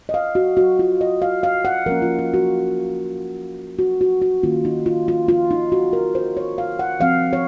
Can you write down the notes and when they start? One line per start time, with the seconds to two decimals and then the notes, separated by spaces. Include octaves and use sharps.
0.09 D#5
0.14 F5
0.35 F#4
0.57 F#4
0.79 F4
1.01 D#5
1.22 F5
1.43 F5
1.65 F#5
1.86 F3 A#3 C#4 A#4
2.02 F4
2.19 F4
2.34 F#4
3.79 F#4
4.01 F#4
4.22 F#4
4.43 D#3 A#3 C#4 F4
4.65 D#4
4.86 F4
5.08 F4
5.29 F4
5.51 D#4
5.72 F#4
5.93 A#4
6.15 C5
6.37 C#5
6.58 F5
6.79 F#5
7.00 F3 C4 F5
7.33 C#5